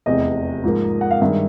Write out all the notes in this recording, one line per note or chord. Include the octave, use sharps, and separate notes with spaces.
F1 E2 C3 D#5
G#2 F3 A#3
F#5
F5
G2 D#3 G#3 E5